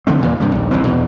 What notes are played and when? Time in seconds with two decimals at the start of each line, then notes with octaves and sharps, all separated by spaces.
0.07 D3 F3 A3 C4
0.20 D#2 A#2 E3
0.40 G2 C3 G3
0.52 A#1 D#2
0.71 F#1 C#3 E3 C4
0.84 E2 B2